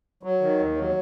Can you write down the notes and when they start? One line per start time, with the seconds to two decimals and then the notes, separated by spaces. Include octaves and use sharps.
0.23 F#3
0.41 D#3
0.59 D#2
0.77 F#3